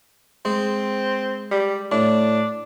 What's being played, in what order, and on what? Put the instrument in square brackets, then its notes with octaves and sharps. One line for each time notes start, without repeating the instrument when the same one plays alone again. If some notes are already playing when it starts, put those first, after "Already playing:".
[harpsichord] G#3 [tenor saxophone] C4
[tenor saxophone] G3
[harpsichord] A2 [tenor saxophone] D4